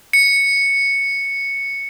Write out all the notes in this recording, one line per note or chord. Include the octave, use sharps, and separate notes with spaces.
C#7